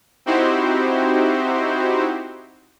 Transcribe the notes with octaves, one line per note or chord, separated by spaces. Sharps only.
C4 D#4 E4 F#4 G4 C5